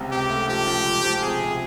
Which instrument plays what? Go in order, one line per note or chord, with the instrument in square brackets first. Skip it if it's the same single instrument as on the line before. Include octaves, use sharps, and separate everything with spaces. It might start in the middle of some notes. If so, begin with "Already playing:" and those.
Already playing: [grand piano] C#2 C3
[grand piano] C3 [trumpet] G4
[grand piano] A3
[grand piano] F3 [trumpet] G4
[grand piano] F3
C#2
F3
[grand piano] C3 [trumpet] G#4
[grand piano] C3